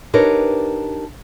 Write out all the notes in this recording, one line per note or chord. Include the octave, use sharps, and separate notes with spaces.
D4 D#4 G4 A#4 B4 C#5